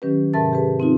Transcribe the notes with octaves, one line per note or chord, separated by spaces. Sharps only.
D#3 F#3 C#4 G4 B4
G#2 C3 A#4 E5 A5 A6
G4 G#4 B4
C4 D#4 F4